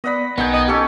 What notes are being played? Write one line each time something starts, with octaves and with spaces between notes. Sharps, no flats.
B3 D5 D#5 F#5 B5
B1 D#3 B3 G#4 G5
D#5
C#4 G4 A4 F5